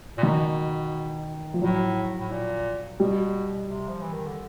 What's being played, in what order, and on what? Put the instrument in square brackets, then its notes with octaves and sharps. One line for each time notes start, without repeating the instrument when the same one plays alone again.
[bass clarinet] A#2
[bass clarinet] B2 [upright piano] D#3
[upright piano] F3
[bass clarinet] A2 [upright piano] F#3
[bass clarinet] A2
A#2
[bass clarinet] B2 [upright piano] G3
[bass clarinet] C3
F3
E3
D#3
D3